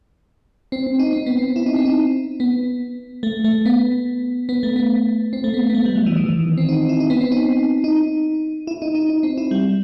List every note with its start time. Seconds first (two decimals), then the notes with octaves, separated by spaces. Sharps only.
0.72 C4
0.87 C4
0.99 D#4
1.13 C4
1.26 B3
1.39 C4
1.56 E4
1.66 D#4
1.76 C4
1.85 D#4
2.40 B3
3.23 A3
3.44 A3
3.66 B3
4.49 B3
4.63 A3
4.76 B3
5.33 C4
5.44 A3
5.54 B3
5.69 B3
5.75 A3
5.85 G3
5.96 F#3
6.06 E3
6.16 D#3
6.26 E3
6.37 D#3
6.57 C4
6.69 D#4
6.89 E4
7.00 D#4
7.10 B3
7.21 C4
7.32 D#4
7.84 D#4
8.67 E4
8.82 D#4
8.95 D#4
9.10 D#4
9.23 C4
9.38 E4
9.51 G3